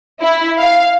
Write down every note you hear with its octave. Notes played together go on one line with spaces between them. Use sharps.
E4
F5